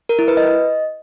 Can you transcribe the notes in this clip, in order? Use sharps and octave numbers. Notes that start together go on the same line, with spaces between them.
A#4
E4
B4
D#5